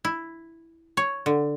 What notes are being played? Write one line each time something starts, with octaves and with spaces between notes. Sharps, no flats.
E4
C#5
D3